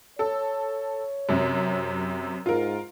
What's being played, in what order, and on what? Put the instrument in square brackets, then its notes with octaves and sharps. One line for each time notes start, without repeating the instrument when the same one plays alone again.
[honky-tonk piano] A4 [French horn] C#5
[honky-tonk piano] F#2 C3
[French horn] G#2 [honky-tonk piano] F4 A#4